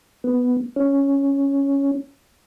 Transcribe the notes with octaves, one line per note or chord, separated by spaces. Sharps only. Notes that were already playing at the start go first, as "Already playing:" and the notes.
B3
C#4